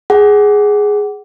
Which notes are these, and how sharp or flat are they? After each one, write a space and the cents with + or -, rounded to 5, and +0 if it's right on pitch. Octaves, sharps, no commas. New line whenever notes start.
G#4 +0 F#5 +25